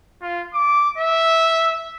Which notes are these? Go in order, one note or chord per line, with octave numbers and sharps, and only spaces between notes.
F4
D6
E5